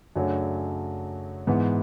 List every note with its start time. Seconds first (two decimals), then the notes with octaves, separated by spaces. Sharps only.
0.16 F#2 C#3 F#3 A3 D4
1.47 G#2 E3 B3